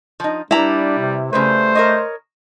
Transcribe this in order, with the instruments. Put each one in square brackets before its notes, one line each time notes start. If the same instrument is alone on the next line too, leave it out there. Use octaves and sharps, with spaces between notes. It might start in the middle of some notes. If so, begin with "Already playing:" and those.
[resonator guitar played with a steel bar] F3 D#4
[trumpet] G3 [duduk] D4 [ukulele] E4 A#5 [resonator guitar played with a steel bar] B4
[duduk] C3
[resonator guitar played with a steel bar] C#3 G3 B4 [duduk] A3 [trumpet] C5
[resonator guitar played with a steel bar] A#4 C#5 D#5